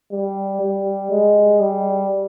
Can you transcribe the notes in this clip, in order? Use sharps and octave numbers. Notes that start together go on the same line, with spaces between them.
G3
G3
G#3
G3